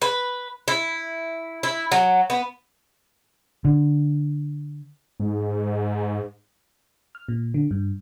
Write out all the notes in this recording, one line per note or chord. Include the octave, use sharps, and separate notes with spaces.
B4
E4
E4
F#3
B3
D3
G#2
F6
A#2
D3
G2